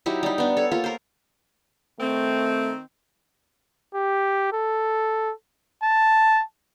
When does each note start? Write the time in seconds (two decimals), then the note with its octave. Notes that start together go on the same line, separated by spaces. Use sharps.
0.06 F#3 D#4 E4 G4
0.23 G3 D#4
0.38 B3 D4
0.57 A4 C#5
0.72 A#3 F4 A4
0.84 A#4 C5
1.99 D#3 A3 C4
3.95 G4
4.53 A4
5.83 A5